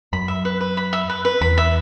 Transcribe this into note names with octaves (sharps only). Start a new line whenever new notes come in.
F#2 B5
E5
B4
B4
B5
E5
B4
B4
E2 B5
E5